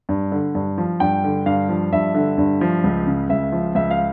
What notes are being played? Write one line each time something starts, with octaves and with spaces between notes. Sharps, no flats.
G2
D3
G2
F3
G2 G5
D3
G2 F5
F3
G2 E5
D3
G2
F3
C#2
C#3
C#2 E5
F3
C#2 E5
F5